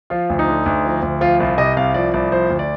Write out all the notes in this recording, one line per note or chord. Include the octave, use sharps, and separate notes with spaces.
F3 F4
D2
D#4
D3
D2
F3
D2
F3 F4
C2 F4
C3 D#5
C2 F5
F3 D5
C2 D5
F3 C5
D2
D5